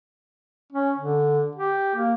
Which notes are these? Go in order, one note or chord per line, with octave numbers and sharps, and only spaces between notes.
C#4
D3
G4
A#3